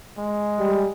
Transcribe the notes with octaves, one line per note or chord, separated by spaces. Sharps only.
G#3
G3